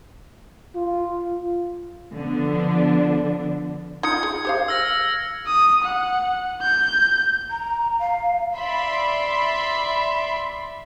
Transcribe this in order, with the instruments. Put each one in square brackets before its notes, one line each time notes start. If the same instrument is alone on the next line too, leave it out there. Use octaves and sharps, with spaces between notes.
[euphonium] F4
[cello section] D3 F3 B3 D4
[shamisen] D#4 F4 [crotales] G#6 C#7
[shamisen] G#4
G4 C5 F5
[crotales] E6 F6 A#6
[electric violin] D#6
F#5
G6
[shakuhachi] A#5
F5
[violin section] D5 E5 B5 C6